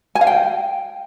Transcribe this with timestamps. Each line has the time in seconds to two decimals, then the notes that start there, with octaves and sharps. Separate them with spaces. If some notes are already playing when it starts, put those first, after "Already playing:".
0.15 G#5
0.21 F5
0.27 G5